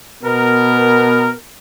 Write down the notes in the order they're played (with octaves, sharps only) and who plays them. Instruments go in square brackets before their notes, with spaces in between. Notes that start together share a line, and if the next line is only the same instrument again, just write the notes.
[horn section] B2 B3 A#4